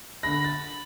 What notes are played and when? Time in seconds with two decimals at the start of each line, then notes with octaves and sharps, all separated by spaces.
0.23 D3 B5 A#6
0.44 A6